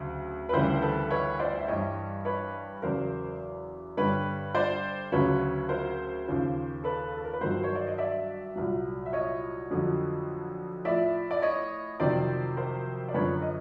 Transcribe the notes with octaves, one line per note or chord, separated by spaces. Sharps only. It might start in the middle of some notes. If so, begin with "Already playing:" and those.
Already playing: D2 C#3 F#3
B4
D2 C#3 E3 G3 A#4 C5
A4 B4
B4 C#5
C5 D5
E5
G2 E3 G3 C#5 D#5
B4 C#5
E2 C#3 F#3 A#4 C5
G2 D3 G3 B4 C#5
C5 D5
D2 C#3 F#3 B4 C#5
A#4 C5
D#2 C#3 F3
A4 B4
A4
A#4
B4
G2 D#3 F#3 A#4 C5
C#5
D5
D#5
D5 E5
C2 A#2 F#3
E5
C#5 D#5
F2 D3 F#3
A2 F3 D5 E5
D5
C#5 D#5
F2 C3 D#3 F#3 C5 D5
A#4 C5
D5
F#2 D3 F3 B4 C#5
D#5